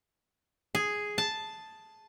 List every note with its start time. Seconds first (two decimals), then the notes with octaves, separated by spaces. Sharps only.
0.75 G#4
1.18 A5